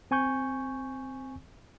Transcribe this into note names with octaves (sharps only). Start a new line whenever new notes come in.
C4 G#5 C#6 G6